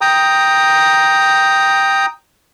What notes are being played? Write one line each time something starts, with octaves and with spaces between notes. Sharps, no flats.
G5 A#5 D#6